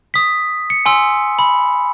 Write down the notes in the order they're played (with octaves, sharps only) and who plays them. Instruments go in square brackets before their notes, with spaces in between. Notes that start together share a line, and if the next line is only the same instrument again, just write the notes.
[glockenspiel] D#6 B6
C#7
G#5 C6 E6
B5